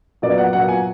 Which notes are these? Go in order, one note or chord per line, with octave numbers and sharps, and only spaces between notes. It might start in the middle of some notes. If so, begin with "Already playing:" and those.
A#2 F#3 B3 D5
F#5
A#2 F#3 B3 F#5
G#5